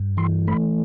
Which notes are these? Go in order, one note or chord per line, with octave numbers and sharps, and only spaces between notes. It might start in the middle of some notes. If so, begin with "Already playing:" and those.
Already playing: G2
E3 C6
A3 B5